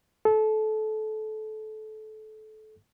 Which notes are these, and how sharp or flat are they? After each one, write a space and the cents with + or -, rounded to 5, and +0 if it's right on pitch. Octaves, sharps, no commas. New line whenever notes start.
A4 -25